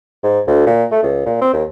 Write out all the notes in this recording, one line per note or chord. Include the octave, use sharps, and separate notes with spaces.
G#2
D2
A#2
A3
C#2
A#2
C4
D#2